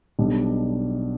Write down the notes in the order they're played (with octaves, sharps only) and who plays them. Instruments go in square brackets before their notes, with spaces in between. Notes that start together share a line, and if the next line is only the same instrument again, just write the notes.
[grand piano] B1 B2 G3 D4